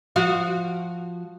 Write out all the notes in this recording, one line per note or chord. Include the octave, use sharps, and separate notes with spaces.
F3 F#4 F5